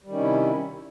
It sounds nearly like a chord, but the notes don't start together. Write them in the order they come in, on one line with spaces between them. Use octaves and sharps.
G3 D#3 C#4 C3 E4